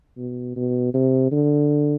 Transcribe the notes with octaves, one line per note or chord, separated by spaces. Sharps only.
B2
B2
C3
D3